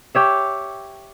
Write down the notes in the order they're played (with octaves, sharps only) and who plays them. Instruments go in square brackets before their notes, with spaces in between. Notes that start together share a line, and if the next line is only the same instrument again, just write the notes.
[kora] G4 C#5 E5